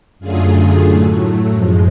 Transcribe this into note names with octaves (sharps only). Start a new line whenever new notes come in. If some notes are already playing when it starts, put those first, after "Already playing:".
F#2 D3 F#3 A3 F4 G#4
A2 F#3 A3
F#2 F3 G#3